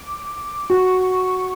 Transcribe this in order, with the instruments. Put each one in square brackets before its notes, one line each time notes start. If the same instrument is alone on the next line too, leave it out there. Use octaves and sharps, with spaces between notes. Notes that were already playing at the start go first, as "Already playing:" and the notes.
Already playing: [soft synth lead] D6
[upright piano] F#4 [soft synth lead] C#6